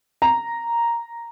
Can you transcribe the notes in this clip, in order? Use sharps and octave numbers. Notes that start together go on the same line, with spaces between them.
A#5